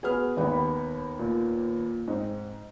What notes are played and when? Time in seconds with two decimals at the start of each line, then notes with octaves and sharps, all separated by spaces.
0.03 B3 F#4 G#4 B4 F6
0.37 G#1 D#2 B3 D#4 G4
0.52 B5
1.19 A#2
2.08 G#2 C4 D#4